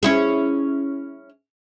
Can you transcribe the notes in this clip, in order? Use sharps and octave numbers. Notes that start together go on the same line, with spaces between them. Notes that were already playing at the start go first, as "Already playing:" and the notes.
C#4 E4 G#4